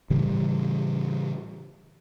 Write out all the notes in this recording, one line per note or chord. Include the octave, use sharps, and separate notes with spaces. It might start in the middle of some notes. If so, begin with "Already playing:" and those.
A2 C#3 E3 G3